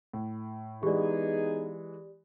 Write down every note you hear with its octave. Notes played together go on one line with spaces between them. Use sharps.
A2
E3 G#3 B3 D#4 G4 G#4 D5